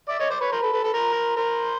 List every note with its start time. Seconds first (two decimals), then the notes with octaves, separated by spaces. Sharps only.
0.08 D5 E5
0.19 C#5 D#5
0.30 C5 D5
0.41 B4 C#5
0.52 A#4 C5
0.62 A4 B4
0.72 A4 B4
0.84 A4 B4
0.94 A#4 C5
1.36 A#4 C5